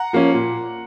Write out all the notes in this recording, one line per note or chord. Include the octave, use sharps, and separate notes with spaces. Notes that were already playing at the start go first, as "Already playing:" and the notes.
Already playing: F#5 A#5
F3 A#3 C#4
A#2